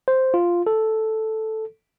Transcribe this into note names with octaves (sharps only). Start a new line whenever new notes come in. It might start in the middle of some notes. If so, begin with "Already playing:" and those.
C5
F4
A4